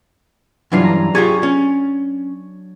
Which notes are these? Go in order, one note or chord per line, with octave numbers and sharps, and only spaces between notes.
G2 E3 F#3 D4 F4 C7
A#5
F4 G4 G#4 C#6 G#6 A6
C#4